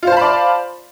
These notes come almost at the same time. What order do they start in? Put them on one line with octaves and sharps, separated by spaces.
F4 C5 A5 B5 D5